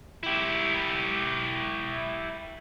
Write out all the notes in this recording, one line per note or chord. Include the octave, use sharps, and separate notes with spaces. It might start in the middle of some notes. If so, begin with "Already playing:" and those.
E4 G4